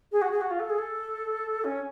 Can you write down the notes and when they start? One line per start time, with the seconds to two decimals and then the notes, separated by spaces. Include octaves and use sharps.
0.12 G#4
0.22 F#4
0.31 G#4
0.41 F#4
0.50 F4
0.60 A4
0.70 G#4
0.78 A4
1.64 C#4